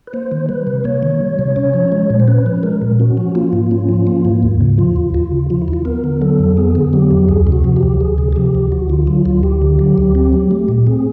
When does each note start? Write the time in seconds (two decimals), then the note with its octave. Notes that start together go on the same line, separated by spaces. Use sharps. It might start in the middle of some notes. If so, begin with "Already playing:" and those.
0.07 B4
0.13 A#3 C5
0.32 D#3
0.49 G3 B4
0.67 C3
0.84 A#3 C#5
1.03 D#3
1.21 G3
1.39 C3
1.56 C#4
1.74 F3
1.92 G#3
2.10 A#2
2.20 C5
2.28 C#4 B4
2.46 F3
2.63 G#3 A#4
2.82 A#2
3.00 C#4 F#4
3.17 F3
3.35 A#3 F4
3.53 G#2
3.71 C#4
3.89 F3
4.07 A#3
4.25 G#2
4.43 D#2
4.61 C#3
4.78 F3 F4
4.96 D#2
5.14 D#2 F4
5.32 C#3
5.50 F3 F4
5.62 E4
5.68 D#2
5.73 F4
5.85 B3 A#4
6.04 D3
6.21 F#3 A4
6.39 F2
6.57 B3 G#4
6.75 D3
6.93 F#3 G4
7.11 F2
7.28 D2 G#4
7.47 C3
7.52 F#4
7.64 F3
7.76 G4
7.83 D2
8.00 D2 G#4
8.18 C3
8.33 G#4
8.36 F3 G4
8.55 D2
8.72 D2 F#4
8.89 D3 F4
9.07 F#3 F4
9.25 D2 F4
9.43 D2 G4
9.62 D3
9.79 F#3
9.98 D2
10.15 C4
10.33 F#3
10.51 A3
10.68 A#2
10.87 C4 G#4